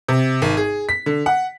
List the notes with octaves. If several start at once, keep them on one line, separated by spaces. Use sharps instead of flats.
C3
G#1
G#4
B6
D3
F#5